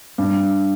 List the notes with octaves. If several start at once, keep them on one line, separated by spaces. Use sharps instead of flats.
G2